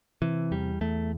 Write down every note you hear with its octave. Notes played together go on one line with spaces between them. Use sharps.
C3 E3
E2 G3
E2 A3